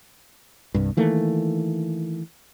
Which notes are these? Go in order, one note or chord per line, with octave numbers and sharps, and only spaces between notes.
C2 G2
D#3 E3 A3 A#3